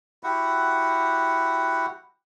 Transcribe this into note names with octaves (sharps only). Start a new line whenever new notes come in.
E4 F#4 G4 F#5